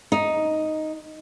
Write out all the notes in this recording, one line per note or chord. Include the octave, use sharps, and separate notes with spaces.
D#4